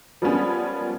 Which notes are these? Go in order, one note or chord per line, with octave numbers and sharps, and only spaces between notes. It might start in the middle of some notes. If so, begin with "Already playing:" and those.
F3 G3 G#3 A#3 B3 C#4